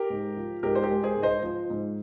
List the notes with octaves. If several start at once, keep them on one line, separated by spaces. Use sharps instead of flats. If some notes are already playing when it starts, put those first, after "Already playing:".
Already playing: G4 A#4
G#2
F3
G#2 G4 A#4
C5
G4 A#4
G#3
G#4 C5
G#2
C5 D#5
F3
G#2